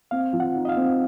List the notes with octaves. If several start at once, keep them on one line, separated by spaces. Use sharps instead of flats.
C4 F5
F3
F#5
D#4
D#5
F5
C4